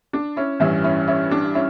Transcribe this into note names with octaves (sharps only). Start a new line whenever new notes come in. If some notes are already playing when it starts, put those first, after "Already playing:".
D4
C#4 E4
A1 G2 E3 C#4 E4
C#4 E4
C#4 E4
D4
C#4 E4